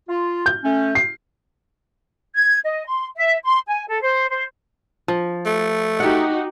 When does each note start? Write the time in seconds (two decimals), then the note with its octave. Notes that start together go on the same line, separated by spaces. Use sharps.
0.09 F4
0.46 G6
0.64 A3 C#4
0.95 C7
2.36 G#6
2.65 D#5
2.87 C6
3.17 E5
3.43 C6
3.67 G#5
3.88 A4
4.02 C5
4.30 C5
5.08 F3
5.45 A3
6.00 D#4 F#4 G4 F#5